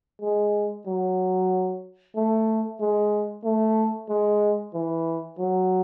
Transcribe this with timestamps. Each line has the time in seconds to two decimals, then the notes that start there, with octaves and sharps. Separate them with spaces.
0.22 G#3
0.86 F#3
2.16 A3
2.80 G#3
3.44 A3
4.09 G#3
4.74 E3
5.39 F#3